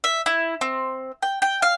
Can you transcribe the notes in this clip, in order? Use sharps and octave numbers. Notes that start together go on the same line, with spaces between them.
E5
E4
C4
G5
G5
F5